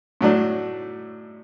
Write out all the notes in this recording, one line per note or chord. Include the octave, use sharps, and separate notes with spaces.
A2 F#3 A3 D4